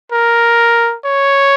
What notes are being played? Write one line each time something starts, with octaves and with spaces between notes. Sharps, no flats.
A#4
C#5